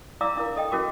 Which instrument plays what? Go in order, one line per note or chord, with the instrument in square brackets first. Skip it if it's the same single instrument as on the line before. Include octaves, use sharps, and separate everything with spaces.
[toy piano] E4 D5 F5 A#5 D6 E6
D4 E4 A#4
A4 D#5 G5
C#4 E4 F#4 A#4 D6